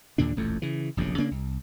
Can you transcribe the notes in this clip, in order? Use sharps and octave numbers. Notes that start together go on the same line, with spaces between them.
D#2 A#2 D3 D4
D#1 A1 F2 A3
C#3 E3
F1 A#1 F#2 C#3
C#3 A#3 D4
C2